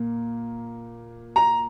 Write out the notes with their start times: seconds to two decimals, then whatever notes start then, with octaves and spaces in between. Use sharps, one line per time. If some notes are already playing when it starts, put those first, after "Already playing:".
Already playing: A#2 A#3
1.36 A#5